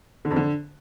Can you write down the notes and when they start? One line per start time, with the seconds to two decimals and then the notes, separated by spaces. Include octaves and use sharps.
0.25 D3
0.31 F2
0.36 D3